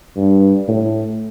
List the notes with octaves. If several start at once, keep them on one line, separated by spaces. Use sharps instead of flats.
G2
A2